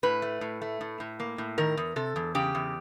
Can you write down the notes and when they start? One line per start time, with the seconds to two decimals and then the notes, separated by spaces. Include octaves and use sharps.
0.03 A2 B4
0.22 A3
0.41 A2
0.61 A3
0.81 A2
1.00 A2
1.20 A#3
1.38 A2
1.58 D#3 A#4
1.77 E2
1.96 C3 A4
2.16 E2
2.35 C#3 G4
2.55 E2